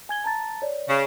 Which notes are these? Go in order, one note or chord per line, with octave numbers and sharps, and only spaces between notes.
G#5 G#6 G7
A5 A#5 A6
C#5 D5
C#3